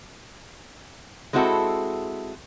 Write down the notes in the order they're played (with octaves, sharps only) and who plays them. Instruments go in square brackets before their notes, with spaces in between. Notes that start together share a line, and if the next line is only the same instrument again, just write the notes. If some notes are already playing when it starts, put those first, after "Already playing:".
[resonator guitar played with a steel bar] G#3 C4 E4 F#4 A4